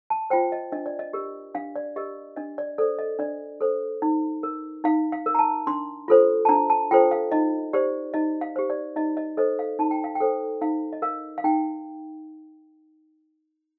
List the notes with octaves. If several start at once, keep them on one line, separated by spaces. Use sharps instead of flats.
A5
F4 C5 G5
D#5
D4 D#5
D5
D#5
G4 A#4
D4 F5
D5
G4 A#4 D#5
D4 D#5
D5
A4 C5 D5
D#5
D4 D5
A4 C5
D#4
A#4
D#4 F5
F5
A#4
A#5
A5
D4 C6
F4 A4 C5
A5
D4 A#5
A5
F4 A4 C5 G5
F5
D#4 D#5
G4 C5 D5
D#4 D#5
F5
G4 C5
D5
D#4 D#5
D#5
A4 C5 D#5
F5
D#4 A5
G5
F5
G5
A4 C5
D#4 F5
D#5
A#4 F5
F5
D#4 G5